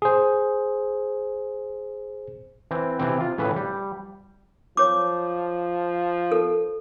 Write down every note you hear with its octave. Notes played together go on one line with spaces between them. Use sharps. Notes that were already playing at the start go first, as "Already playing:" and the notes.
G#4 C5
E3 C4
C3 E3 C4
F4
A2 C#3 E3 B4
G3
F3 C#5 D6
A4